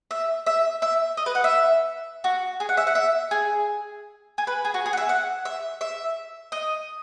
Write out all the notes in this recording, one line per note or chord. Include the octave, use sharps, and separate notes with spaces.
E5
E5
E5
D#5
B4
F#5
E5
F#4
G#4
F#5
E5
F#5
E5
G#4
G#4
B4
G#4
F#4
G#4
F#5
E5
F#5
E5
E5
D#5